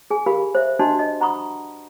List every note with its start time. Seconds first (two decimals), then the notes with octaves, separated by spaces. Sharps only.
0.10 G#4 G#5
0.26 G4 A#4 F5 B5
0.55 C5 E5
0.79 D4 F#4 D#5 A5 C6
0.99 D#5
1.20 F#5 A#5 B5 C#6 D#6